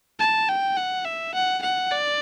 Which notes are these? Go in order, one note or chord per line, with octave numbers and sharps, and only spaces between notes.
A5
G5
F#5
E5
F#5
F#5
D5